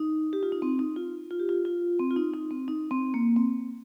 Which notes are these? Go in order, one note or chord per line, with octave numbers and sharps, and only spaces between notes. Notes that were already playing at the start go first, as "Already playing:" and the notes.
Already playing: D#4
G4
F4
D#4
C4
D#4
F4
F4
G4
F4
F4
C4
F4
D#4
D#4
C4
D#4
C4
A#3
C4